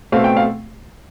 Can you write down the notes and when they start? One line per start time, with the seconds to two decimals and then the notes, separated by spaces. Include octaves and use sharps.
0.12 B2 A3 C4 F5
0.24 G5
0.37 F5